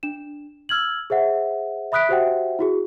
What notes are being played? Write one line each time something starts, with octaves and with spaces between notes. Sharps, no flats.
D4 E7
E6 F6 G#6 F#7
G#4 C5 E5 F#5
E5 B5 D#6 F#6 B6 D7
F#4 G4 C5 E5 F#5 G5
E4 F#4 G#4